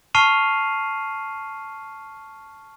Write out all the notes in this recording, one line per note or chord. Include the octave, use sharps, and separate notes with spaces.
A5 C#6 F6 C7 D#7 F7